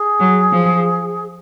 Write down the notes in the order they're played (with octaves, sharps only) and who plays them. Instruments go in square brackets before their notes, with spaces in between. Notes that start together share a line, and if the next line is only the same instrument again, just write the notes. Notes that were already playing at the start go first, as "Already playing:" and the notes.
Already playing: [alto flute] G#4
[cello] F#3
F3